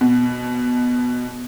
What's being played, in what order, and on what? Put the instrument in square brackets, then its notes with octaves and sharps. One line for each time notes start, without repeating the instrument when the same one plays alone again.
[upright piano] B2